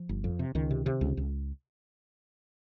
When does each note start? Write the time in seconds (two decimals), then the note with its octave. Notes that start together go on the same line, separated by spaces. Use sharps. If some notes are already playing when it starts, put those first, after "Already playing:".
Already playing: F3
0.09 G1
0.24 F2
0.39 C3
0.55 C#2 D#3
0.71 C3
0.86 C3
1.01 C#2
1.17 C#2